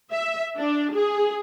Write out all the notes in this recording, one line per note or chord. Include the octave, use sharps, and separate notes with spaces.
E5
D4
G#4